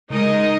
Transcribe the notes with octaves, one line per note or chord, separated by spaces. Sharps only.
C#3 G#3 D#4 A#4 D#5